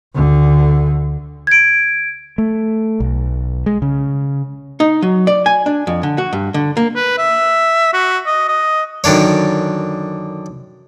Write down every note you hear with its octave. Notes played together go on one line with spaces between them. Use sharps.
D2 D3
G#6 D7
A3
B1
G#3
C#3
D#4
F#3
D5
G#5
D4
F2
D3
F#4
G2
D3
A#3
B4
E5
F#4
D#5
D#5
F#2 D3 D#3 D4 C#5